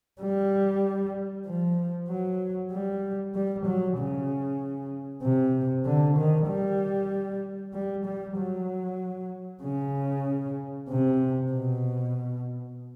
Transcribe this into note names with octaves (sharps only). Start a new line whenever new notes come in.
G3
F3
F#3
G3
G3
F#3
C#3
C3
D3
D#3
G3
G3
G3
F#3
C#3
C3
B2